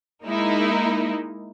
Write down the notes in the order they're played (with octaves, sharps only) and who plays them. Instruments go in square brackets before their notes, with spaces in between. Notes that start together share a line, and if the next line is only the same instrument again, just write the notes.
[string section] G#3 A#3 D#4 E4